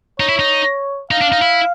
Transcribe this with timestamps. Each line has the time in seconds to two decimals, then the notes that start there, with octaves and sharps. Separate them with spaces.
0.19 D#4 C#5
0.29 E4
0.39 D#4
1.11 D#4 F5
1.21 D4
1.32 D#4
1.42 E4